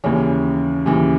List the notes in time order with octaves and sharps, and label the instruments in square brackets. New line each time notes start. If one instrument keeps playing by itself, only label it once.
[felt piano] D#2 C#3 E3 C#4
D#2 C#3 E3